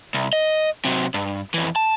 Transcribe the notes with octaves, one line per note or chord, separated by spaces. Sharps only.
C2
D#5
C3 F#3
G2
F2 E3
A5